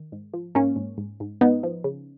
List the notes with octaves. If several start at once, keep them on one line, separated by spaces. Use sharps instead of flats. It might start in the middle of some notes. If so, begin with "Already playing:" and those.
Already playing: D#3
G#2
F3
G#2 A#3 C#4
G#2
G#2
G#2
G#2 B3 D#4
F3
C#3